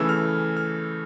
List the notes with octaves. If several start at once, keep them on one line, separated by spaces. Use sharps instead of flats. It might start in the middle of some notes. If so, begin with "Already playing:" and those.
Already playing: C#3 E3 A3 E6
F6
F6